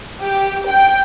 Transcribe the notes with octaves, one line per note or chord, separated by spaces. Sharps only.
G4
G5